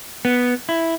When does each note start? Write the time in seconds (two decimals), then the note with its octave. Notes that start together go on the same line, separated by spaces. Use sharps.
0.25 B3
0.69 E4